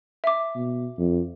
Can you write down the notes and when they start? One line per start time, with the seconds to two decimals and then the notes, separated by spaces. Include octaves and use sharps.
0.24 E5 D6
0.55 B2
0.98 F2